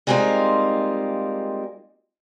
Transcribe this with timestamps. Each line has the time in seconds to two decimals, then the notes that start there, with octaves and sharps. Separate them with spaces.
0.07 G3 G#3 A#3 C4 D#4 F4